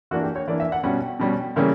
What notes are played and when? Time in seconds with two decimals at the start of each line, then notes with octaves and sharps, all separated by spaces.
0.11 E3 A#3 D4 F#4
0.23 G4
0.36 C#5
0.48 E3 A#3 D4 D5
0.60 E5
0.72 F#5
0.83 B2 G3 C#4 F#5
1.19 B2 G3 C#4
1.56 C#3 E3 G3 A#3 C#4